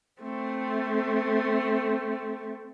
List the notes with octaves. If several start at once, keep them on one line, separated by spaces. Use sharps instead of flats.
A3 C4